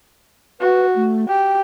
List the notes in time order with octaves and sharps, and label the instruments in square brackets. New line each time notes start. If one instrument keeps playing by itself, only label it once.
[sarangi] F#4 [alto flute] B4
[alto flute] A3
[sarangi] G4 [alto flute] G5